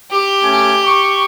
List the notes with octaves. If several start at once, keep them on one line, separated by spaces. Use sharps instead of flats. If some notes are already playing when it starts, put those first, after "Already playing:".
G4
A3 C#4 G#5
C#6